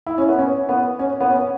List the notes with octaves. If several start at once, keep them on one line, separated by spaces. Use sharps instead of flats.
E4
C#4
B3
C#4
B3
C#4
B3
C#4